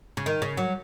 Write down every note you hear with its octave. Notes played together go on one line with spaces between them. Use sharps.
C#3
D#3
C#3
F#3